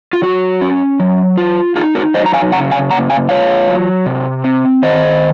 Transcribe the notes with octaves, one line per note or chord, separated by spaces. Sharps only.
F4
F#3 F#4
C#4
F#3
F4
D#4 F4 G#4
F#4 A#4
F#3 C5 D#5
A#5
F5 G#5
C#3 F#5 A#5
F5 G#5
A#3 F#5 A#5
F5 G#5
F4 C#5 F5
F#3
C3
C4
D#3 C5 D#5